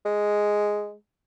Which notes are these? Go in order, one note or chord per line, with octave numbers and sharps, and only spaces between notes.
G#3